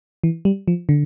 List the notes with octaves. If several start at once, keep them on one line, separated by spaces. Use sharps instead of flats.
E3
G3
F3
D3